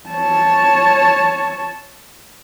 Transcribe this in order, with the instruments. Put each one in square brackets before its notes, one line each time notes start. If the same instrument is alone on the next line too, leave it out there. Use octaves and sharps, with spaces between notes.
[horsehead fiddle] C#5 A5